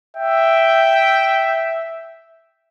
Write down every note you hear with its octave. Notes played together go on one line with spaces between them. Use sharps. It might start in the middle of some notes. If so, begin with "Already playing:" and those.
E5 G5